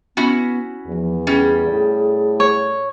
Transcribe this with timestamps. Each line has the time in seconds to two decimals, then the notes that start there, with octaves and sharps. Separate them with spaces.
0.17 B3 C#4 E4 F#4
0.86 E2 F3
1.27 G3 C#4 G#4
1.68 A2
2.40 C#5